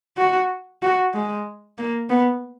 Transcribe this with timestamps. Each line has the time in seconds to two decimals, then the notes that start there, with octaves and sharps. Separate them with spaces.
0.17 F#4
0.82 F#4
1.14 G#3
1.78 A#3
2.09 B3